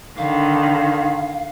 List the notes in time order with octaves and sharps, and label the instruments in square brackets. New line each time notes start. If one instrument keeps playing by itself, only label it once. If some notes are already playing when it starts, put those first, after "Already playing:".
[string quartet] D3 D#3 [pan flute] F5